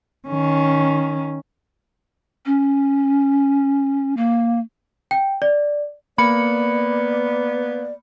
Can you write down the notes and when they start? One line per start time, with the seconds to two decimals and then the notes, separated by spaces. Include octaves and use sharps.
0.28 D#3 C#4
2.46 C#4
4.17 A#3
5.11 G5
5.42 D5
6.18 A#3 B3 D5 B5 C#7